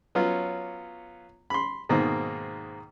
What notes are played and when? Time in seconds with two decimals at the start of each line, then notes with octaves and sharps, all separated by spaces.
0.15 F#3 B3 C#4 F4
1.50 B5 C6
1.89 G#2 B2 D#3 A#3 C4